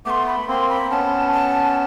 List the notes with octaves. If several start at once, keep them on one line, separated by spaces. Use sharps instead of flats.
A3 B3 C6 D6
B5
A#3 C4 C6
B5
B3 C#4 A5
A5